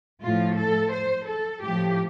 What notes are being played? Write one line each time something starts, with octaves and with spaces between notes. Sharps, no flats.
A2 F3 F4
A4
C5
A4
A2 F3 G4